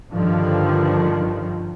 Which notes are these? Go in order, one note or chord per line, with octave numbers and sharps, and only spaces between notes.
G2 D3 D#3 F3